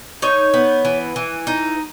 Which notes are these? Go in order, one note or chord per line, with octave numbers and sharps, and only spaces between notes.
D#4 C#5
B3
E3
E3
D#4